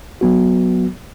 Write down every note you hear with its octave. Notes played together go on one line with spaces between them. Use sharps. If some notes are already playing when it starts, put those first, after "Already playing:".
F#3 B3 F#4